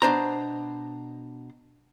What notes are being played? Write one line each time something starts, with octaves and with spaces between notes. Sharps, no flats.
B2 D4 C5 A#5